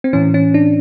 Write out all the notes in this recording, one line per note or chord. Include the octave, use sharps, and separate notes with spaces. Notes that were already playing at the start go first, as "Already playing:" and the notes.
C4
A2 E3 C#4
C#4
D4